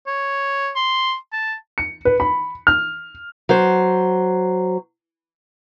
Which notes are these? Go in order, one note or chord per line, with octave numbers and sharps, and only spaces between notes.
C#5
C6
A5
C#7
B4
B5
F6
F#3 C5